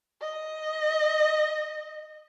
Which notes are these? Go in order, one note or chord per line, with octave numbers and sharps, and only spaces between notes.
D#5